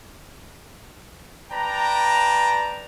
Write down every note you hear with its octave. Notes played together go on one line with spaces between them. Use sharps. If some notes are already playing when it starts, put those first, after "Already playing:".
B4 D5 G5 A5 A#5